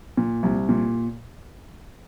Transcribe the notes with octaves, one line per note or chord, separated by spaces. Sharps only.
A#2
C2
A#2